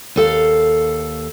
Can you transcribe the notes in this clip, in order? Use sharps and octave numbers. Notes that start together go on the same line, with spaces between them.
D#2 A4 F5